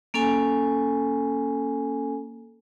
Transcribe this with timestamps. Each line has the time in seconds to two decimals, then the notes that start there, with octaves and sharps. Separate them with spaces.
0.14 A#3 C#4 A4 G#5